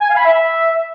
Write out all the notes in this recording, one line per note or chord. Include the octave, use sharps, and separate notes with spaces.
G#5
F5
B5
E5